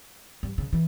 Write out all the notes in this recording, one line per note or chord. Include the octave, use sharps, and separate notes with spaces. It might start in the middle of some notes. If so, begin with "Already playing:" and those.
G2
C#3
E3